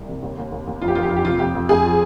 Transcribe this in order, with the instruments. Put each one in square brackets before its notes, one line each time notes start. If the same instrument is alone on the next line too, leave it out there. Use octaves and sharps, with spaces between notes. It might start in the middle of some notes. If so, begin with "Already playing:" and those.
Already playing: [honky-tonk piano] C2
C3
D#2
D#2
D#2
D#2
F2 F4
G4
F2 F4
G4
F2 F4
G4
C3 F4
F2 G4
F2
F2 G#4
F3